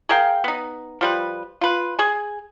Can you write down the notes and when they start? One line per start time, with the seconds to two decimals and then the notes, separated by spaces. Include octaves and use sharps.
0.09 G#4 A#4 F5 G5
0.44 B3 D#4
1.01 F3 G3 B4
1.61 F4 B4
1.99 G#4 G#5